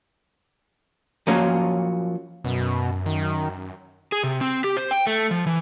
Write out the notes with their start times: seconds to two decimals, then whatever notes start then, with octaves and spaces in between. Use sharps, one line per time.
1.27 F3 F#3 A#3 C#4
2.44 F#2 B2
3.06 D#3
4.12 G#4
4.24 C3
4.41 C4
4.64 G4
4.77 C5
4.91 G5
5.07 A3
5.31 F3
5.47 E3